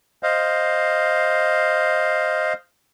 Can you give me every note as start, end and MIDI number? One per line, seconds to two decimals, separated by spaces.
0.23 2.53 72
0.23 2.53 75
0.23 2.53 77